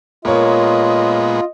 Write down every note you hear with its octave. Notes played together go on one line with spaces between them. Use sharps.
A#2 G#3 B3 F4 A#4 C#5 D#5